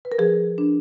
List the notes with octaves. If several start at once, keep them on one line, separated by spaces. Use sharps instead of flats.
B4
A#4
F3 G#4
D4